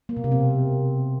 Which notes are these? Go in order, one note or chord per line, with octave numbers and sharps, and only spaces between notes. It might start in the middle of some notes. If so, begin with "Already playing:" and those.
A#3
B2
C3
C4